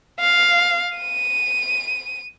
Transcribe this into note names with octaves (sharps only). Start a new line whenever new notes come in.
F5
D#7